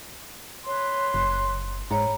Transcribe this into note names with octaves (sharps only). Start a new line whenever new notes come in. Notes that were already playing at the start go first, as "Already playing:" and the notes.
B4 C#5 C6
F#1
G#2 C#5 A#5 B5